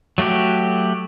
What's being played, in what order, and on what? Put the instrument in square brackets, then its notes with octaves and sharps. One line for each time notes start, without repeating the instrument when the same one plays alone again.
[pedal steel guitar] F#3 A3 F#4 G4